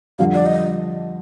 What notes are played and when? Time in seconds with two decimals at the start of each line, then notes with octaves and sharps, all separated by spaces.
0.19 F2 D3 G3 F5
0.34 D5
0.46 D#5